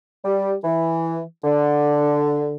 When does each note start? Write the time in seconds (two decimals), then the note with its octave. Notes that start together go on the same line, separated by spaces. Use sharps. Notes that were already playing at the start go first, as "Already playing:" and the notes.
0.25 G3
0.64 E3
1.44 D3